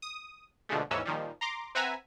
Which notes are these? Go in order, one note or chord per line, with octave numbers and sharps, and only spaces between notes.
D#6
B2 D3 F3 G#3 A3
D#2 G#2 E3 C#4 E6
A#2 D#3 F3 G3
A#5 C6 D6
C4 B4 E5 F#5 G#5 A#5